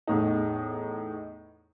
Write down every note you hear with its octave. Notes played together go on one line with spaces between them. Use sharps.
E2 A2 D#4